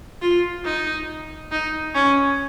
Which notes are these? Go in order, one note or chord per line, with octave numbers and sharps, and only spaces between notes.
F4
D#4
D#4
C#4